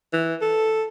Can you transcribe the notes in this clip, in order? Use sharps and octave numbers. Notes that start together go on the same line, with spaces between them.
E3
A4